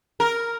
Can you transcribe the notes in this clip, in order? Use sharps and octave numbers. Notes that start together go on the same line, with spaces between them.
A#4